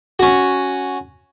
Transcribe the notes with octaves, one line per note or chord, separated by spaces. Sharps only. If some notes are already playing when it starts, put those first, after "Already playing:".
C#4 F#4